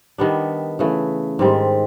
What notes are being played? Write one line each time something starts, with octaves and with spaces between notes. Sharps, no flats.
D#3 G3 B3 D4
C#3 E3 A3
G#2 D#3 G3 C4